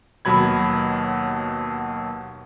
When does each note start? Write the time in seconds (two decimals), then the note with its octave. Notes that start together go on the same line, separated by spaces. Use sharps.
0.25 D#2 B2 F#3 B5 G#6